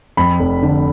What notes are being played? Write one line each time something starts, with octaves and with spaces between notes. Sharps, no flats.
F2 B5
F1
D3